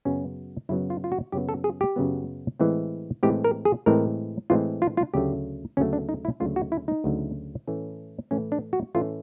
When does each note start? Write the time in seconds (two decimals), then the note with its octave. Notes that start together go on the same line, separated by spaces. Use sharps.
0.05 F#2 C#3 F#3 B3 C#4
0.69 F#2 C#3 F#3 B3 E4
0.90 F4
1.04 F4
1.12 F#4
1.32 F#2 C#3 F#3 B3 G4
1.49 A4
1.64 G#4
1.81 G4
1.96 F#2 C#3 F#3 B3
2.60 A2 E3 G#3 C4
3.23 A2 E3 G#3 C4 G4
3.44 A#4
3.65 G#4
3.86 A2 E3 G#3 C4 A#4
4.50 A2 E3 G#3 C4 F4
4.82 F4
4.97 F4
5.14 D2 C#3 F#3 A3 G4
5.77 D2 C#3 F#3 A3 C#4
5.93 D4
6.09 D#4
6.25 E4
6.40 D2 C#3 F#3 A3 F4
6.56 F#4
6.72 E4
6.88 D#4
7.04 D2 C#3 F#3 A3
7.67 A2 E3 A3 C#4
8.31 A2 E3 A3 C#4
8.52 D4
8.73 F#4
8.95 A2 E3 A3 C#4 F4